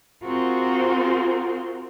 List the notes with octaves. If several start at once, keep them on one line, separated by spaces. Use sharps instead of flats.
C4 F4 F#4 G#4 A#4 C5